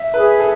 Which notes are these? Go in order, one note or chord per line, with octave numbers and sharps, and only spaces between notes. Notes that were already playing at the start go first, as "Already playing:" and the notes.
Already playing: E5
G#4 B4
A4